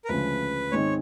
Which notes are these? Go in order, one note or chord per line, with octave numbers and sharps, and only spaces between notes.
A#4
D2 C#3 F3 G#3 C#4 B4
G#2 D#3 G#3 C4 D#4 C#5